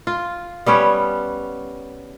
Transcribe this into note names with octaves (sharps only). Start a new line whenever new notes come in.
F4
G3 B3 C#4 C#5